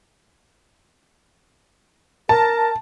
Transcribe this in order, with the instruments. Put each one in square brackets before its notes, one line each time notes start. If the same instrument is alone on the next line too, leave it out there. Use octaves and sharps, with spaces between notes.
[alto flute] A#4 [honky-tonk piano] A5